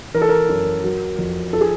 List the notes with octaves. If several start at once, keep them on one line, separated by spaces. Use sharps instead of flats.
E3 A#4
A4
A#4
F#2
F#3
F2
F3 A4
G#4